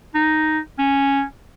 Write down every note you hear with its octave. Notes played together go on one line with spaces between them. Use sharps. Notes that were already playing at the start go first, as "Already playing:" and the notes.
D#4
C#4